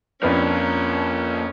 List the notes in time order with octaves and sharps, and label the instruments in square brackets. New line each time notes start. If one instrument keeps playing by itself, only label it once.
[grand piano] F2 D4 B4 [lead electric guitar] F3 A#3 [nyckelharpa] C#4